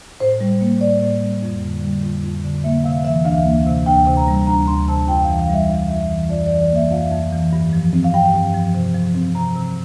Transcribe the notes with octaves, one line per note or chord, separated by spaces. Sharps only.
A2 C5
G3
A#3
A2 D5
A2
G3
F2
D3
G3
F2
F2
D3
A#3 E5
C3 F5
E3 E5
D2 F5
A#3
C3
D2 G5
C3
A#5
G3
D2 A#5
D2 C6
C3 A5
F2 G5
E3 F5
F5
G3 E5
F2 E5
F2
E3
F2 D5
E3 D5
D5
A#3 E5
F2 F5
F2
E3
G2
F3
C4
F5
G2 G5
G2
F3
C3
F3
C4
C3 A#5
C3